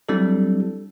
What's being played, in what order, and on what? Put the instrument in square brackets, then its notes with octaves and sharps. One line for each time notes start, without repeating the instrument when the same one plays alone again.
[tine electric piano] F#3 G3 C4 D4 E4 A4